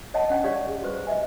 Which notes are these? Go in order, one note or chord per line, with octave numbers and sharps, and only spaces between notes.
C#5 D#5 F#5 A5
C#4 F#5 G5
G4 C#5 D5 F5
G#4
F#4 G4 B4 C5
D#5 E5 G#5